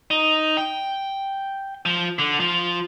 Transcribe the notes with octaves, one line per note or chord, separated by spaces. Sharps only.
D#4
G5
F3
D3
F3